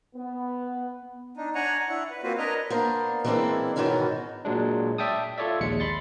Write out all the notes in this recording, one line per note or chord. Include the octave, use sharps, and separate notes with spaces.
B3
D4 D#4
D4 C#5 F#5 G#5 A#5 C#6
D4 E4 F#5 C#6
B4
A#3 C4 F4 F#4 B4 C5
D4 A#4 B4 C#5 D#5 A#5
A#3 B3 D4 C5
E3 G#3 A#3 C4 D4 E4
G#2 B2 D#3 E3 C#4 F#4
A#2 F#3 G#3 D4
D5 E5 G5 A5 D#6
F4 A4 C#5 D5 E5
A#1 D#2 G#3 C#7
B5 C6 A6